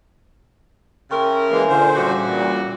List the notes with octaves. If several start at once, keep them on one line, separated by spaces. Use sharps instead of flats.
C#3 E4 A#4 G5 C6 C#6
E3 G#3 A#3 C#5 F5 G#5
A#2 D3 D4 C5 G#5
C#3 E3 G3 F#4 D6
A#2